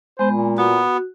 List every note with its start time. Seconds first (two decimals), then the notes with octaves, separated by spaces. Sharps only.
0.19 G#3 B3 C5
0.31 A#2
0.58 B3 F#4